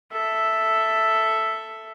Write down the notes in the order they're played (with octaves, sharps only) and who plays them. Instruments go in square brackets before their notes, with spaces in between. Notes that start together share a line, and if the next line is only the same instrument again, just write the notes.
[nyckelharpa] A4 E5